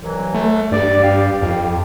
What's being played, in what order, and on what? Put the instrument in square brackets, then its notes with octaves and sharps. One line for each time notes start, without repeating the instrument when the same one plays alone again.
[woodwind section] C2 E3 F#3
[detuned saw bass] A3
[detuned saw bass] G2 [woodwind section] D5
[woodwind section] G4 D5 F5
[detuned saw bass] F2